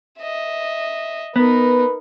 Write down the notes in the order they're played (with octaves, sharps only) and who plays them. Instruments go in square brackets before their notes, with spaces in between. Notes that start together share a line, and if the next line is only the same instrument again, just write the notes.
[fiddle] D#5 E5
[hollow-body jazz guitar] B3 [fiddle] D#4 A#4 [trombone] B4